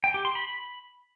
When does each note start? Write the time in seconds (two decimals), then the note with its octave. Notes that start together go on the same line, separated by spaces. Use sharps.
0.04 G5
0.14 G4
0.25 C6
0.35 B5